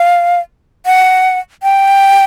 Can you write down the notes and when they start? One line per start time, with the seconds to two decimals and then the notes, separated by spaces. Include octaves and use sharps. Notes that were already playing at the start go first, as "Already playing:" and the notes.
Already playing: F5
0.86 F#5
1.63 G5